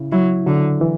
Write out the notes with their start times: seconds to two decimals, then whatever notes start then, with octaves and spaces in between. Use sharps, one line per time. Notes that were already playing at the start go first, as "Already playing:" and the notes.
Already playing: C#3 E4
0.12 F#3 E4
0.46 D3 F#3
0.81 E3